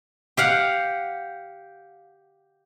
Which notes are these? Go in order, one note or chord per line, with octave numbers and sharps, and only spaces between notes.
G4 F5 F#5